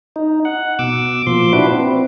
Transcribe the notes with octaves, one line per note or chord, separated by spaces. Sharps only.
D#4
F#5
B2 D6 E6
A#2 F3 C6 D6
D4 E4 F#4 B4
C4